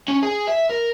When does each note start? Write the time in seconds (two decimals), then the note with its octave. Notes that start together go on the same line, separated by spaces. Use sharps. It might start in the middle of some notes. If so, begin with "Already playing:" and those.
0.08 C#4
0.23 G#4
0.47 E5
0.70 A#4